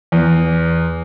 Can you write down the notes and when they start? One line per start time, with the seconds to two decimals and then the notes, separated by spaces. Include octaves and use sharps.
0.12 E2